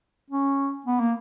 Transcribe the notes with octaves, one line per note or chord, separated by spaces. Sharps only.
C#4
B3
A#3